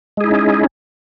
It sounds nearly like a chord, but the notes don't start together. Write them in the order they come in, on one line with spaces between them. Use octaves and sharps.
G#3 G#4 E4 D#4 C#4